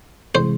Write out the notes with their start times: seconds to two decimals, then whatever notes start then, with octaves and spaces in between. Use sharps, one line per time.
0.35 C3 E3 G#3 C5